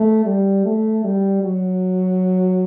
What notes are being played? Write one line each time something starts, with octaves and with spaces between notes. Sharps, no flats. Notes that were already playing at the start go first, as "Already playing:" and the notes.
Already playing: A3
G3
A3
G3
F#3